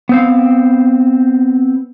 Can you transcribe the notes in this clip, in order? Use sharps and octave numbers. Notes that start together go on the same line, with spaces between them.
B3 C4 F5